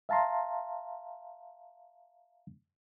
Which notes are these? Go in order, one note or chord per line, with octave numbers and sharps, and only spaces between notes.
E5 F5 A5 A#5 C6